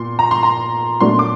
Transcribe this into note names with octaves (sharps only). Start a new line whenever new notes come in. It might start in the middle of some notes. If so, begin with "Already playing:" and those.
Already playing: A#2 C6
A#5
C6
A#5
A#2 F#3 A3 D4 C6
D6